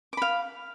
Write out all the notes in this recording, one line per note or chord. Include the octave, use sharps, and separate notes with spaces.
F5 B5 D6